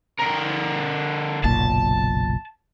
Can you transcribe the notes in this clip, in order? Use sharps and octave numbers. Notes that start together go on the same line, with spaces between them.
D3 A#4
F#1 B1 A#2 A5